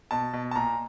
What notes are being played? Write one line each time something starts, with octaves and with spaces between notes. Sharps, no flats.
B2 A5
B2
A5
A#2 A#5